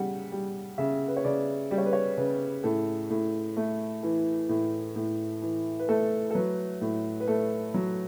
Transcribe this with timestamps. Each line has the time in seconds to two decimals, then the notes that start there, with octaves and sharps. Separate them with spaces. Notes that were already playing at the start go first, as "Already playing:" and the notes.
Already playing: C#3 G3 F#5
0.32 G3
0.78 C#3 E5
1.08 B4
1.17 C#5
1.24 C#3 D5
1.71 G3 D5
1.78 C#5
1.86 B4
1.93 C#5
2.17 C#3 B4
2.64 A2 A4
3.10 A2
3.57 A3
4.03 E3
4.49 A2
4.96 A2
5.42 E3
5.79 B4
5.89 A3 A4
6.30 A4
6.35 F#3 B4
6.81 A2
7.20 B4
7.28 A3 A4
7.74 F#3